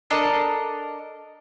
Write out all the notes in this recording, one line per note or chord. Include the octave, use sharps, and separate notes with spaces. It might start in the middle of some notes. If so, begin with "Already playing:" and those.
D4 A4 A#4 D#5